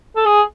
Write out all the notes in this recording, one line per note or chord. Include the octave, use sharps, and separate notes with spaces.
A4
G#4